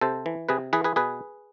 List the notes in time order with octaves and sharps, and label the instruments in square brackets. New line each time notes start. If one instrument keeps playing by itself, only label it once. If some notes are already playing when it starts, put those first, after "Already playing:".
[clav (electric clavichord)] C3 A4 C5
E3
C3 G#4 B4
E3 G#4 B4
G#4 B4
B2 G#4 B4